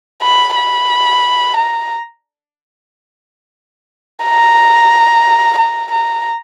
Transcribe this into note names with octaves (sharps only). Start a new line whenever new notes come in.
B5
B5
A#5
A#5
A#5
A#5